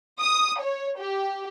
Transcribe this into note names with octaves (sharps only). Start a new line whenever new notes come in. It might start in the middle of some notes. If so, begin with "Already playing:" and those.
D#6
C#5
G4